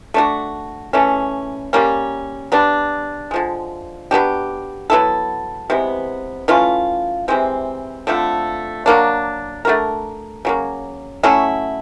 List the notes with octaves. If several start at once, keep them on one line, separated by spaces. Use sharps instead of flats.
A3 D4 F#4
C#3 E3 A3 C#4
G3 A#3 C#4
G3 B3 D4
D3 F3 G#3
F#3 B3 D4 G4
F#3 B3 E4 A4
C3 E3 G#3 B3
E3 A3 C#4 F4
C3 E3 G#3 C4
D3 F3 A3 C4
F#3 A#3 D4
A3 D4 F#4 A#4
C#3 F#3 A#3
F#3 A3 C#4 E4